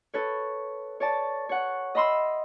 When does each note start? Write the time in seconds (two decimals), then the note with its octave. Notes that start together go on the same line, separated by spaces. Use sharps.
0.14 A4 B4 C#5
1.00 C#5 D5 A5
1.49 C#5 F#5
1.95 D#5 E5 B5 C6 E6